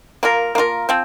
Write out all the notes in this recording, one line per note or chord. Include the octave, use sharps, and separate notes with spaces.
A#3 F4 A#4
A#3 F4 A#4
F3 C4